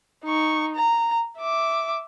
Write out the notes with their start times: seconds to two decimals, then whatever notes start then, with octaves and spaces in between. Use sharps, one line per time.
0.24 D#4 C#6
0.75 A#5
1.38 E5 D6